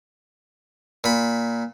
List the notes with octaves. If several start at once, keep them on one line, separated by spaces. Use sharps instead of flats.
A#2 B5